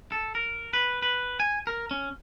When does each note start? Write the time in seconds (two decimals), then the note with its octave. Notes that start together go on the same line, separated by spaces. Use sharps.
0.12 A4
0.35 A#4
0.73 B4
1.02 B4
1.40 G#5
1.67 A#4
1.91 C#4